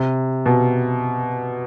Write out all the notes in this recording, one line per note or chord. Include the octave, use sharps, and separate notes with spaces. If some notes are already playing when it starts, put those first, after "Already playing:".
Already playing: C3
B2